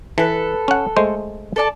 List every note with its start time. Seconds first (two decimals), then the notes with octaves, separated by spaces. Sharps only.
0.18 E3 A4 B4
0.68 C#4 F#5
0.97 G#3 A3 C5
1.56 A4 D5 A5